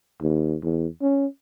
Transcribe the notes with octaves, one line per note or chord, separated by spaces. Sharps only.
D#2
E2
C#4